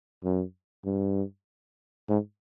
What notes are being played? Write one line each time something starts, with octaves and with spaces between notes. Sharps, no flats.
F#2
G2
G#2